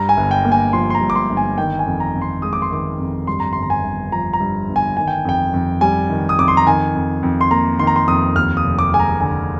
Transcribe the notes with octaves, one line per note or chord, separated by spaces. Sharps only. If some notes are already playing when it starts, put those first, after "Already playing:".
Already playing: G2 A#5
G#5
G1
G5
A#3
G#5
F3 C6
C6
A#5
G2
D6
C6
G1
G#5
D#3 G5
G#5
F2
A#5
F2
C6
G#3 D#6
D6
C6
D#3 D6
F2
G2 C6
A#5
G1 C6
A#5
G#5
G1
F3 A#5
A#5
G2
G1
G#5
D#3 G#5
G5
F2 G5
F2
G3 G#5
D#3
D#6
F2 D6
C6
A#5
D#3 G#5
F2
F2
C6
A#3 A#5
D#3 C6
A#5
C6
F2 D#6
D#2 F6
D#6
F1
D6
G#3 G#5
A#5
D3 G#5